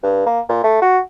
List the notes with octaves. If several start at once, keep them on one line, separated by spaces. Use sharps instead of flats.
G2
A#3
A#2
A3
F#4